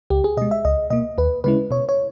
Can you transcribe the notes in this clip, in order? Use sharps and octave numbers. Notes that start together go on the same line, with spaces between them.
C#2 G4
G#4
B2 G#3 D#5
E5
C#2 D#5
B2 A#3 D#5
D#2 B4
C#3 G#3 C#4 E4 B4
B2 C#5
C#5